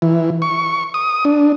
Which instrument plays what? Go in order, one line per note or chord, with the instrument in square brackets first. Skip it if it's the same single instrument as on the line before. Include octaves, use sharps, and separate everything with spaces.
[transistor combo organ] E3
C#6
D#6
D4